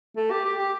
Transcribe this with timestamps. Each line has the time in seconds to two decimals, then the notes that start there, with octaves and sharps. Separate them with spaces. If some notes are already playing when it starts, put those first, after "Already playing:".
0.17 A3
0.31 G4
0.45 G4
0.58 G4